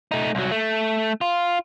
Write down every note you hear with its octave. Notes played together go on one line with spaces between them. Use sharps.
A3 D#4
C2 F#3
A3
F4